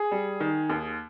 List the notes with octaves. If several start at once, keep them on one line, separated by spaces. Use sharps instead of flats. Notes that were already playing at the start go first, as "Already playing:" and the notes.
Already playing: G#4
G3
D#3
D#2